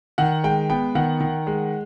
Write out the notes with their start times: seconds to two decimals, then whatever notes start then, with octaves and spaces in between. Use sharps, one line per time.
0.18 D#3 F#5
0.44 G#3 G5
0.70 B3 G5
0.95 D#3 F#5
1.20 D#3
1.47 G#3